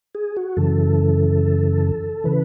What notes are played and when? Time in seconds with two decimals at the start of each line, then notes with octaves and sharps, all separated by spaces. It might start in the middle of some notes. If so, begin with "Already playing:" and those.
0.15 G#4
0.37 F#4
0.57 F#2 C#3 E3 A4
2.24 C#3 E3 B4